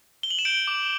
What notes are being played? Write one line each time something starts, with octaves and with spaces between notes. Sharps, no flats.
G7
F#7
E7
G6 D7
D6